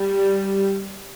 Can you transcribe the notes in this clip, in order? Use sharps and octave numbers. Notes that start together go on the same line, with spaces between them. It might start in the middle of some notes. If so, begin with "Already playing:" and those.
Already playing: G3